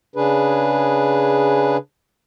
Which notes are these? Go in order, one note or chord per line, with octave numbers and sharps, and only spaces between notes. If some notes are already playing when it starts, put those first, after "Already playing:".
C#3 D4 G#4 B4